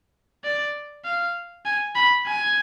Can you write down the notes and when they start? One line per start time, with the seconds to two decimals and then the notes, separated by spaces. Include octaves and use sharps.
0.44 D5
1.05 F5
1.65 G#5
1.95 B5
2.26 G#5